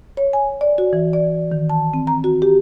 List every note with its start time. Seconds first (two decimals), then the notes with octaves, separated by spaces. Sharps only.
0.17 C#5
0.33 G#5
0.61 D5
0.78 F#4
0.93 E3
1.13 D5
1.52 D#3
1.70 A5
1.94 C4
2.07 A#5
2.24 F#4
2.42 G4